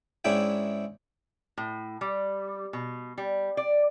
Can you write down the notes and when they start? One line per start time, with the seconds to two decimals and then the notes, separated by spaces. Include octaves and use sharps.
0.25 G#2 C#4 D4 E4 E5 G5
1.58 A2
2.01 G3
2.73 B2
3.18 G3
3.57 D5